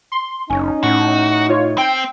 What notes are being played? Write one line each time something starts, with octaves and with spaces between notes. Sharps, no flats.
C6
F#1 C#4 D#4
A2 F#4
F4 C#5
C4 G5